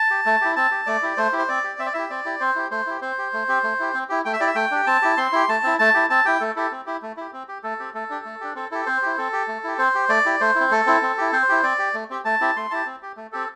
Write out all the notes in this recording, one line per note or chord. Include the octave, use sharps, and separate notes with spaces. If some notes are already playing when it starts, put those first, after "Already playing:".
Already playing: A5
G4
A3
E4 G4
C4 A5
G4
A3 D5
E4 G4
A3 C5
E4 G4
C5
C4 D5
G4
C4 E5
D5
E4 G4 E5
C4 D5
E4 G4
C4 C5
E4 G4
A3 C5
E4 G4
C4 C5
G4
A3
C4 G4
A3
E4 G4
C4
E4 G4
A3 G5
E5
E4 G4 D5
E5
A3 G5
D4 G4
C4 A5
E4 G4
C4 C6
E4 G4
A3 A5
C4 E4
A3 A5
E4 G4
C4 A5
E4 G4 G5
A3 A4
E4 G4 A4
C4
E4 G4
A3
E4 G4
C4
G4
A3 A4
C4 G4
A3 A4
D4 G4
A3
D4 G4
C4 A4
E4 G4 A4
C4 C5
E4 G4
C4 A4
G4
A3
E4 G4
C4 C5
G4
A3 D5
E4 G4
A3 C5
E4
C4
A3 A4
C4 E4
C4
E4 G4
C4 C5
E4 G4
C4 D5
G4
A3
C4 G4
A3 A5
C4 E4 G4
A3 C6
E4 G4 A5
C4
G4
A3
C4 G4 A4